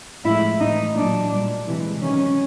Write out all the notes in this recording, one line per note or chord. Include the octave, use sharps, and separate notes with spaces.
A2 F3 G#3 E4
A2 E3 G#3 D#4
A#2 F#3 D4
A#2 G3
C3 E3 G#3
C3 D#3 F#3 C#4